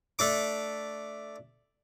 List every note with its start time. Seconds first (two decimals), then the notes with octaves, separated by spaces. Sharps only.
0.19 A3 D4 D6